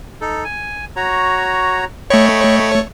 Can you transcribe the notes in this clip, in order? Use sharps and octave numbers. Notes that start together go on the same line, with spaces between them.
D#4 A4
G#5
F#4 C#5 A#5
A3 C#5 D#5 G5 B5